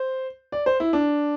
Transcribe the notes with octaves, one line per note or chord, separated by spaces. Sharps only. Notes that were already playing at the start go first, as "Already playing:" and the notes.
Already playing: C5
D5
C5
E4
D4